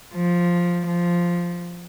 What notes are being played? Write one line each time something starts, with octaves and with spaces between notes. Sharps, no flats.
F3
F3